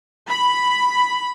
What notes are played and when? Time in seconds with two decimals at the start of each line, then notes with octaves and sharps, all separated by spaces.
0.29 B5